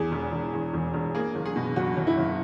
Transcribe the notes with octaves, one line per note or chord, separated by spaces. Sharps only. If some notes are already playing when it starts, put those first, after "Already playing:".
Already playing: E2 G#4
E1
E1
E2
E1
E1
A#3 G#4
F#1
G#4
B2
F#1 F#4
F#1
E4
F#1